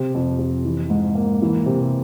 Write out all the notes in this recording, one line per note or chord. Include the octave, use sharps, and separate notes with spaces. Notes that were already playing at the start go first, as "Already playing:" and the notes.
Already playing: C3
F2
F2
E3
G#2
A#3
E3
C3